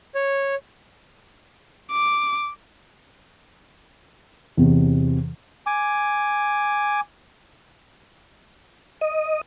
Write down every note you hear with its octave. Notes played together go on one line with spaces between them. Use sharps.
C#5
D6
E2 C3
G#5 D6
D#5